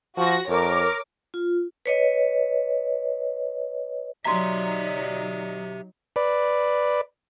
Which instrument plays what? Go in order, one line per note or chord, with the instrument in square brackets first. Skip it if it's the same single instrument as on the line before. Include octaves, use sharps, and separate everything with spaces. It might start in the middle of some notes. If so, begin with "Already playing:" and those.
[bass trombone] F3 [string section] F#4 A#6
[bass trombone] F2 [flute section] A#4 [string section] C#5 D6
[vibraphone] F4
B4 C#5 D#5
[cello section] F#3 D#4 [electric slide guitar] G4 E5 [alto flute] D5 [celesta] A#5 C6
[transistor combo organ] B4 D5